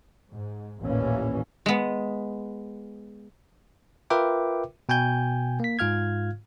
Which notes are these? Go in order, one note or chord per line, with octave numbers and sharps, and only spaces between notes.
G#2
A1 D#2 A#2 E3 A#3 C#4
G#3 B3
F4 A#4 B4 E5 G5 D6
B2 G5 G#5 G6
A#3 B6
G#2 F4 F5 F6 G#6